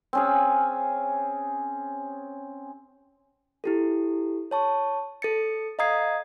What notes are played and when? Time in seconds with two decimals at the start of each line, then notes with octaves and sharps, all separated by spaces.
0.13 C4 C#4 G#4
3.64 E4 G4 A4
4.51 C#5 A5 C#6
5.22 A4 A6 C#7
5.79 D#5 F5 A#5 D#6 G#6 C7